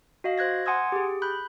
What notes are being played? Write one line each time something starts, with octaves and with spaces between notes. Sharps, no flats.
F#4 D#5 F5
C5 F#6 G#6 A#6
F#5 G#5 C6 D#6 E6 G#6
G4 G#4
B5 F#6 G6